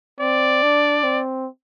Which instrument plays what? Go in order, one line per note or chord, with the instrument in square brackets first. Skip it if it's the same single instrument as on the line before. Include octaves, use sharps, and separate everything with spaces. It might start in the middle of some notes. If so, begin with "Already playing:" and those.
[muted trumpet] C4 [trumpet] D5
[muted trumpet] D4
C4